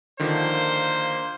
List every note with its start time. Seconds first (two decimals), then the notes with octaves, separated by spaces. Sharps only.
0.20 D3 D#3 F3 A#3 C5